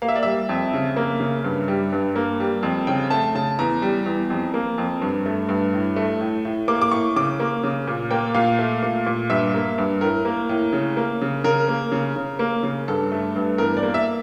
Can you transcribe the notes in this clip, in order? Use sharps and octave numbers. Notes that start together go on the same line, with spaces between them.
A#3 F5
E5
D5
G3 E5
F2
C#3
A#3
C#3
G2
G3
G2
A#3
G3
F2
C#3 G5
A3 A5
C#3 A5
E2 A#5
G3
E2
F2
A#3
F2
G2
A3
G2
A2
A3
A2
A2
A#3 D6
D6
A2 C#6
C#3 D6
A#3
C#3
A#2
A#3 G5
A#2 F5
A3
A#2
A#2
G2 E5
A#3
G2
A2 A#4
A#3
A2
C#3
A#3
C#3
C#3 A#4
A#3
C#3
C#3
A#3
C#3
G2 A4
A3
G2
E2 A#4
D5
A#3
E5